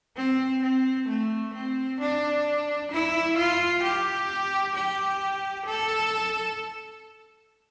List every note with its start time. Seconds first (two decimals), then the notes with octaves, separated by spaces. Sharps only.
0.17 C4
0.63 C4
1.08 A3
1.54 C4
2.00 D4
2.92 E4
3.37 F4
3.84 G4
4.75 G4
5.66 A4